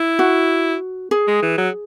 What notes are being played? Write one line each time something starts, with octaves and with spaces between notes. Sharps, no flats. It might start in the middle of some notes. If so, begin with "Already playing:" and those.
Already playing: E4
F#4
G#4
G#3
E3
F#3